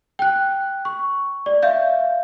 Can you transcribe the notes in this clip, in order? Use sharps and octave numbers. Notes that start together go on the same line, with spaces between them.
G5 F#6
C#6
D5
E5 F5 G6